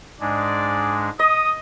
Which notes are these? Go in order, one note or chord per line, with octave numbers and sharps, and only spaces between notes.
G#2 G#3 D4 D5
D#5 D#6